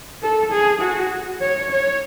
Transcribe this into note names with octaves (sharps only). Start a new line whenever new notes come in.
A4
G#4
F#4
C#5
C#5